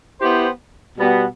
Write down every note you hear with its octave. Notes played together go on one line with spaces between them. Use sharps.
B3 E4 G4 C5
B2 G3 B3